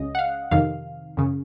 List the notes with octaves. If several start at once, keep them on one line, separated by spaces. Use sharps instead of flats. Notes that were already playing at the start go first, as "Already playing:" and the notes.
Already playing: C#2 C#3 D#5
F#5
F5
F2 C3 D#3 F5
F#2 C#3